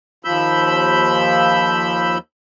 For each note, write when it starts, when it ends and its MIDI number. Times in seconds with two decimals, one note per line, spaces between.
0.25 2.18 39
0.25 2.18 53
0.25 2.18 83
0.25 2.18 88
0.25 2.18 91